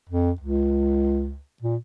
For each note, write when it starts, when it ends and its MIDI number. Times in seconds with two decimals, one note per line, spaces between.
0.09 0.31 41
0.40 1.39 37
1.62 1.76 46